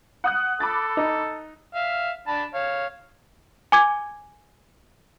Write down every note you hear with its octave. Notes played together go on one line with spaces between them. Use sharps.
F#5 D#6 F#6
A4 B5 D6 A6
D#4
E5 F5
D4 A5 B5
C#5 F5
G#5 D6 G#6